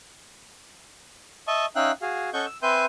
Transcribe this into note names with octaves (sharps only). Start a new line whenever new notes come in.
D#5 E5 A5 C#6 D#6
C#4 D#4 E5 F5 G5 F#6
F#4 G#4 F5
C#4 A4 D#5 F#5 C#6 G6
E6
C4 B4 E5 G#5 C6 G6